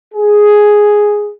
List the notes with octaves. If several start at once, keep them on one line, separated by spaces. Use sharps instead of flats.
G#4